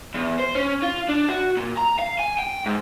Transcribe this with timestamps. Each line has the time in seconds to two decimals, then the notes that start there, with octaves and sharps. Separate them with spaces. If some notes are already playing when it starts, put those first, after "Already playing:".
0.15 E2
0.40 C5
0.55 C#4
0.83 F4
1.09 D4
1.29 F#4
1.57 A#2
1.78 A#5
1.99 F5
2.19 G#5
2.39 G5
2.66 G#2